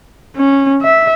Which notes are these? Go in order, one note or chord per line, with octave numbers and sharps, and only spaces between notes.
C#4
E5